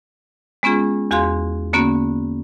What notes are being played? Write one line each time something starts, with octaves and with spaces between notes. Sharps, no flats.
G#3 B3 C#4 F4 G#4
E2 F#4 G#4 F5 C6
D3 A#3 B3 C#4 F#4